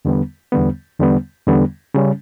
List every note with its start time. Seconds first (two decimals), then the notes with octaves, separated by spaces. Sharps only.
0.05 E2 D3 G3 B3
0.52 E2 D3 G3 B3
1.00 E2 D3 G3 B3
1.47 E2 D3 G3 B3
1.94 C#3 G3 C#4